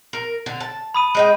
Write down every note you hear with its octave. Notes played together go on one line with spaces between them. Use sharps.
A#4
D3
A5
B5 D#6 D#7
G#3 D#5 G5